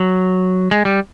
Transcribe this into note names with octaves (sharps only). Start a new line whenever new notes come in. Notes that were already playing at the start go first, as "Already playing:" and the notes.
Already playing: F#3
G#3
G3